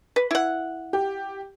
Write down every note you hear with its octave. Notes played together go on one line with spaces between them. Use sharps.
B4
E4 F#5
G4